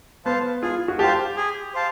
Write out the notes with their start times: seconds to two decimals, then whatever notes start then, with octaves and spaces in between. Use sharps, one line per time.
0.25 B3 C5 F5 A5
0.62 F4 G#4
0.88 F#4
0.99 G4 C5 F5 A5
1.36 G#4
1.74 C5 F5 A5